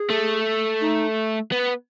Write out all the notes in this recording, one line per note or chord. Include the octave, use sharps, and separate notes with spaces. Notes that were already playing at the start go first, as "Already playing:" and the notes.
Already playing: G#4
A3
D#4
B3